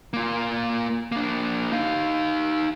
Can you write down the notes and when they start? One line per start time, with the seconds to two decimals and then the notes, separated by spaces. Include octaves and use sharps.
0.13 A#3 F4
1.12 A#3 D4
1.72 D#4 F5